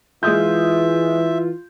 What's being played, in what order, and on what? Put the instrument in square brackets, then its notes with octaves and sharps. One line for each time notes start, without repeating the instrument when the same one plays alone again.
[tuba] E3 [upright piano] G#3 D#6 G6 [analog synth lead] F4 [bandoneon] E5